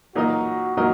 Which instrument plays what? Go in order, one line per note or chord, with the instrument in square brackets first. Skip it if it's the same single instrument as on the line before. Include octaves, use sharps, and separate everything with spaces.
[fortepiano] A#2 F#3 D#4 A#4 D#5 [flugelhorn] F#4
[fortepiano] A#2 F#3 D#4 A#4 D#5